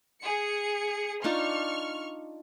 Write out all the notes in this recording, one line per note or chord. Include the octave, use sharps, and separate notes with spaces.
G#4 C#7
D4 D#4 F4 C#6 F6